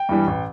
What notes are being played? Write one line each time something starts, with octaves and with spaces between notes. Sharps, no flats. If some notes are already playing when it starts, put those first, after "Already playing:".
Already playing: G5
G2 E3 G3
A1